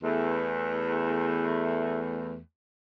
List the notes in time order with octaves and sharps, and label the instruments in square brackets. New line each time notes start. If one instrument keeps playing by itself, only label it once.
[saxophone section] E2 A3